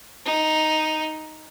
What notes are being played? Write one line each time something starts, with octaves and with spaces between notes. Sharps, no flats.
D#4